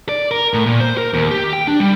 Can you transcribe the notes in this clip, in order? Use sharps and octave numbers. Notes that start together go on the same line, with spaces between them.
D5
A#4
A2
A#2
C5
A#4
D#2
G4
G5
D4
G3